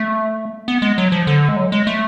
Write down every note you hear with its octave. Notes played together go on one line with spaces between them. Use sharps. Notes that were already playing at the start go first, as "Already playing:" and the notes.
Already playing: A3
B3
G#3
F#3
F3
D3
G#3
F#3
G#3
A3